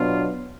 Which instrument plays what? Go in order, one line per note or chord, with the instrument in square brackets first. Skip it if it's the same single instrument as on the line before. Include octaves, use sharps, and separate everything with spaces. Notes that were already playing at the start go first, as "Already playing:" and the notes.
Already playing: [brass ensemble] B2 F#3 B3 D4 F4